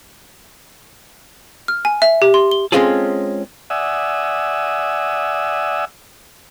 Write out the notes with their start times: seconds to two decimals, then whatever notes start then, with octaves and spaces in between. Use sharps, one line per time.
1.68 F6
1.85 G#5
2.02 E5
2.22 G4
2.34 C6
2.51 G7
2.72 G#3 C4 C#4 F4 G#4 A4
3.70 D5 E5 F#5 G#5 D#6 E6